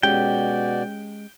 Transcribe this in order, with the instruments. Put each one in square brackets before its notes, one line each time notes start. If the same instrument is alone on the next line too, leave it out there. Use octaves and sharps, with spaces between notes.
[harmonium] B2 F#4 D5 [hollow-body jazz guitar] G#3 C#4 G4 [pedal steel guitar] G5